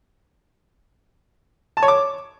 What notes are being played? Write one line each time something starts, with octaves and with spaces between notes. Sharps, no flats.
A5
C#5
D6